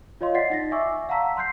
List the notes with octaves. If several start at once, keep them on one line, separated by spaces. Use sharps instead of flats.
F4 C#5 D#5 F5 C6
D5 D#5 F#5 A6 B6 C7
D#4 A6 A#6
D5 E5 G#5 C#6 D6 E6
F5 F#5 A5 A#5 E6 B6
C6 F#6 G6 C7